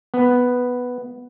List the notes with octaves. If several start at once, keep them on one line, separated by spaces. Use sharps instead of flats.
B3